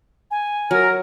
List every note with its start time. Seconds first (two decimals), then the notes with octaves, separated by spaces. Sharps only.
0.31 G#5
0.71 F#3 A#4